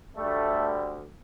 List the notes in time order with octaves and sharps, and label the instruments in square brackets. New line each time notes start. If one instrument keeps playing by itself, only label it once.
[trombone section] D2 D3 G3 A3